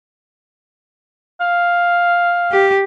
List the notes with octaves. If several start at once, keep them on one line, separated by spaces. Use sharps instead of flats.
F5
G4